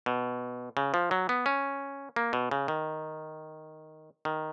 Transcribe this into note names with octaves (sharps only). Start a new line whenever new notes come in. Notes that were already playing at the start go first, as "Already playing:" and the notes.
B2
C#3
F3
F#3
B3
C#4
A#3
B2
C#3
D#3
D#3